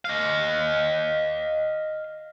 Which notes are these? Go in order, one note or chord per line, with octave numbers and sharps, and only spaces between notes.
D#5 F5